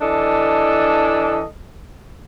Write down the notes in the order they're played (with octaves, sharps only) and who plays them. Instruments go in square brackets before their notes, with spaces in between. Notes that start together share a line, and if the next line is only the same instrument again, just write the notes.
[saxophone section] E3 D4 A4 D#5